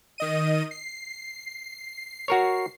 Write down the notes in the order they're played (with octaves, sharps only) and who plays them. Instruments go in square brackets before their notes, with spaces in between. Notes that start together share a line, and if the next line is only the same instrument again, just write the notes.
[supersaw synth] D#3 D#5 D#7
C7
[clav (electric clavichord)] F#4 A#4 C#5